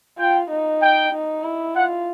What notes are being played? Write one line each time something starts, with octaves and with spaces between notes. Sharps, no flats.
F4 G5
D#4
G5
D#4
E4
F4 F#5